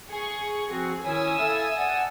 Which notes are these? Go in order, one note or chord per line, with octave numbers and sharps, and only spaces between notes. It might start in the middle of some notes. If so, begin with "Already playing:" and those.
G#4 C#6
F3 C4 F#4 G#4
D#3 C#4 E4 C#5 G#5 D#6 E6
E4 A4 E5 F5
D5 F#5 A5